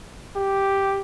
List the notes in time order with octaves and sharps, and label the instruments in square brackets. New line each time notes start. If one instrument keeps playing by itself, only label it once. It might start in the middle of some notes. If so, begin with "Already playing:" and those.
[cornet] G4